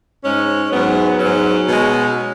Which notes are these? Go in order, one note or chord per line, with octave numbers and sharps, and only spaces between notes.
G#2 G#3 C#4
G#2 F#3 B3
G#2 F#3 C#4
B2 G#3